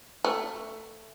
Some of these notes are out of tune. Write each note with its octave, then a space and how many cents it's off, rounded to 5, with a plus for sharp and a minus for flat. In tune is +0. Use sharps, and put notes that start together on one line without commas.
A3 +10